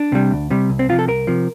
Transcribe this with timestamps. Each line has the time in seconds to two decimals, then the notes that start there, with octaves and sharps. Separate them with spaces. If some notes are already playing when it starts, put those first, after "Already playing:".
Already playing: D4
0.12 C3 G3
0.31 D2
0.51 C3 G3
0.70 C2
0.79 C4
0.89 C3 F4
0.92 F3
0.99 A4
1.08 C2 A#4
1.27 C3 F3